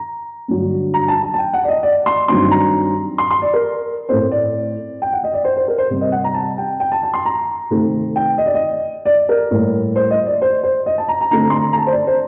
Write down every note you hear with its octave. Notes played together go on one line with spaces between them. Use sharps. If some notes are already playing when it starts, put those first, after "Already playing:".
Already playing: A#5
G2 D3 F#3
A#5
A5
A5
A5
G5
F#5
D5
D#5
D5
C6
G2 D#3 F#3 C4 C6
A#5
C6
C6
D5
A#4
A2 A3 C4 C5
D5
G5
F#5
D#5
D5
C5
C5
A#4
C5
C3 G3 C4
D#5
F#5
A#5
A5
G5
G5
A5
A5
C6
A#5
C3 D#3 A3 C4
G5
D#5
D5
D#5
D5
A#4
A2 G3 A#3
C5
D#5
D5
C5
C5
D#5
A5
A#5
A#5
D3 A3 C4 A#5
C6
A#5
A#5
A5
C5
D5
C5